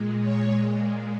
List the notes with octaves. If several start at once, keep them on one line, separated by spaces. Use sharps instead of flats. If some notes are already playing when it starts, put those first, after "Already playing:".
Already playing: A#2 G#3
C#5